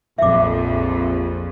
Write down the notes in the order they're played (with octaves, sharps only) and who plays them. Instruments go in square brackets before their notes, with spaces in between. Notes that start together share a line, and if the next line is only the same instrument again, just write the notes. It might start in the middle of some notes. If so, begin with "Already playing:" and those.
[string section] A#1 F2 [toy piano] E5 D6